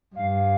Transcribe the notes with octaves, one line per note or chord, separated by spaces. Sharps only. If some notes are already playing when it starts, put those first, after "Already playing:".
G2 F5